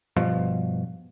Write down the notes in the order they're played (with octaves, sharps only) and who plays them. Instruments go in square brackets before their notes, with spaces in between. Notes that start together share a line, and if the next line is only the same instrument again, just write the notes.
[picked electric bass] G2 B2 F3